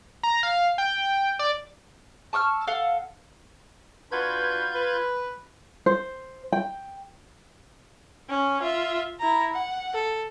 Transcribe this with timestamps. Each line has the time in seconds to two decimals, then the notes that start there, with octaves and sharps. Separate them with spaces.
0.23 A#5
0.43 F5
0.78 G5
1.39 D5
2.33 A5 C#6 E6 F6
2.67 A4 F5 F#5
4.12 D4 F4 F#4 B4 G6 G#6
4.74 B4
5.86 C5
6.52 G5
8.29 C#4
8.62 F4 E5
9.20 E4 A#5
9.54 F#5
9.94 A4